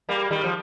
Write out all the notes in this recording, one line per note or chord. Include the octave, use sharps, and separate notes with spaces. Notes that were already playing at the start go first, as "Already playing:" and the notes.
G3 A#3
D#3 G3
F3